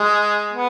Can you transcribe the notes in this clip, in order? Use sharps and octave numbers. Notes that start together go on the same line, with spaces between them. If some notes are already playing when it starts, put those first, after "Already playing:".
Already playing: G#3
B3